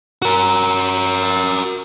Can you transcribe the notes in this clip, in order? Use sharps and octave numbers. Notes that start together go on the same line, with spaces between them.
F#4 A#4